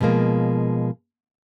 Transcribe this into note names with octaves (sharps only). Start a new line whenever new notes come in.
B2 F3 G#3 A#3